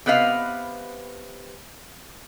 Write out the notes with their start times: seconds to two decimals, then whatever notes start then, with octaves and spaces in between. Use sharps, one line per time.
0.06 C3 B3 B4 D#5 F5